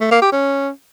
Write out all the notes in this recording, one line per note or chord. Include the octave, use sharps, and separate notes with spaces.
A3
A#3
G4
C#4